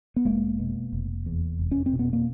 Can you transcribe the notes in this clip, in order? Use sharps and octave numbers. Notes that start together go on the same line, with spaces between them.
B3
F1 G#3 A#3
B2
F1
E2
F1
C#4
C4
B2
B3
A#3